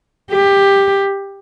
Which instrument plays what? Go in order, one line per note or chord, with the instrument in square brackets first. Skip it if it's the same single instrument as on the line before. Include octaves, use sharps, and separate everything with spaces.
[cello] G4